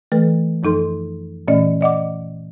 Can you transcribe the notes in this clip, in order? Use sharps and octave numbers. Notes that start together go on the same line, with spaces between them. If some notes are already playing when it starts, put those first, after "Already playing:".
E3 A3 A4 B4
F#2 F3 D#4 A4 C6
A#2 E3 A3 C#4 D5 D#5
D5 D#5 F#5 D6